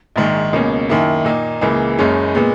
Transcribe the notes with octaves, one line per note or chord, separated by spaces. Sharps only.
A#1 G#2 D#3
C#2 B2 A#3 C#4
F#2 D#3 A#3 E4
A#2 A#3 D#4
C#2 C#3 E3 A#3
F#1 F#2 C#3 G#3 C#4
A#2 G#3 B3